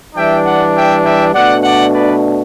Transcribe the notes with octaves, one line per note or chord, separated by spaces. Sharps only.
E3 G3 D4 E5 G5
D5 F#5
E5 G5
E5 G5
B2 A3 D4 D5 F#5
D5 F#5
B4 D5